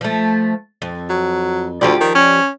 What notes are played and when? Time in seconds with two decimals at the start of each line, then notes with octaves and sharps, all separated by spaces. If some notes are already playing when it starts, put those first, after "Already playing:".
0.01 F3 A3
0.82 F2
1.10 F#3
1.81 D2 F3 G4 D5
2.01 D#3
2.15 C#4